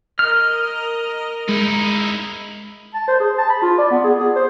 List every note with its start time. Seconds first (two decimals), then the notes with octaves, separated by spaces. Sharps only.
0.19 A#4 D#5 F6
1.49 G#3 D#4 E4
2.94 A5
3.08 C5
3.20 G#4
3.38 A5
3.50 B5
3.62 F4
3.78 D5
3.91 B3
4.04 G#4
4.20 G#4
4.36 C5